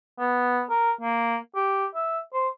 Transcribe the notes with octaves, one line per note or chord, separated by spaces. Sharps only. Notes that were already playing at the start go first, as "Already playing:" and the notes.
B3
A#4
A#3
G4
E5
C5